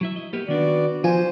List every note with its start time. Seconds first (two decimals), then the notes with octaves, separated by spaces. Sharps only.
0.01 F#3 E4 E5
0.16 D#5
0.33 A#3 B3 G4
0.48 D#3 B3 D4 F#4 D5
1.04 F3 F4 C5 G#5